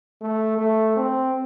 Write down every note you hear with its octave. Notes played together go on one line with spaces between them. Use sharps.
A3
A3
C4